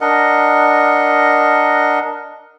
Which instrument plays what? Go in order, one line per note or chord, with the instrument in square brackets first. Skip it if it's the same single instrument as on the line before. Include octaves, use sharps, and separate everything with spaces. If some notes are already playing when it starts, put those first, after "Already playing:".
[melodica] D4 A#4 D#5 F#5